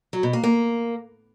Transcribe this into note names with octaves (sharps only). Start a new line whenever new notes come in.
F#3
B2
A#3
A#3